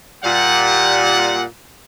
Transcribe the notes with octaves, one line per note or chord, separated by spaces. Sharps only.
A#2 G3 F#5